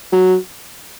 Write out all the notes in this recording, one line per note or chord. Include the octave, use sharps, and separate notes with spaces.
F#3